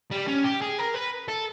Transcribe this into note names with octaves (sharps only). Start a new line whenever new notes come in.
G3
C#4
G4
G#4
A#4
B4
A4